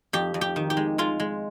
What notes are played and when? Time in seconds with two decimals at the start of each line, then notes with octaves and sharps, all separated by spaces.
0.13 F2 G4
0.34 F2
0.41 G4
0.56 D#3
0.70 G4
0.77 G#3
0.98 G#3 F4
1.20 G#3